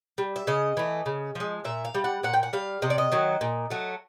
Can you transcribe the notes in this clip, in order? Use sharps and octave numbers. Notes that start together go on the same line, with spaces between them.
G3
E5
C#3 D#5
E3 A3
C#3
F3 G#3
A#2 E5
F5
G3
F#5
A#2 F#5
G5
F#5
G3 F5
C3 D#5
D5
D#5
D#3 F#3
A#2
F#3 A3